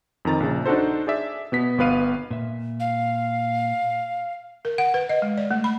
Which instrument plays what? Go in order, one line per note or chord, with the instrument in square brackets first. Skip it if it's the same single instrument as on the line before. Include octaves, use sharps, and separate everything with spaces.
[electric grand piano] F2 D#3 A#5 A6
A#1 C#3
D4 D#4 F#4 A4 C5
G#4 D5 E5
B2 B3 B6
G1 B3 B4 F5 D#7
[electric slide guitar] A#2 E5
[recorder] F5
[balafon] A#4
F#5
B4
D#5
G#3
D5
A3
B5